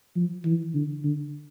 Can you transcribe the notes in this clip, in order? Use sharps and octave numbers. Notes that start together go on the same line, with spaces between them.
F3
E3
D3
D3